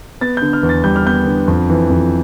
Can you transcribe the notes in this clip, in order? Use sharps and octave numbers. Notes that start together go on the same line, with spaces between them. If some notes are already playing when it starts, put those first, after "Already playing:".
B3 A6
G6
D3
F6
E2
A6
G3 G6
F6
B3 G6
D3
F2
E3
F2